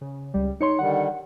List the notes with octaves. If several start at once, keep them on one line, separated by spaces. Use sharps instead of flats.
C#3
C#2 G3
D#4 C#5 C6 C#7
D3 D#3 G3 F#5